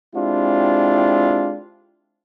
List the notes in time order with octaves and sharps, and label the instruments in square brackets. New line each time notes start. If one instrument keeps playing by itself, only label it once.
[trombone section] G#3 C4 D4 E4 F4 G4